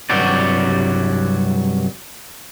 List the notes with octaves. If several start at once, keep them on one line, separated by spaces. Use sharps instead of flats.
C2 G2 F#3 F#4 G4 D5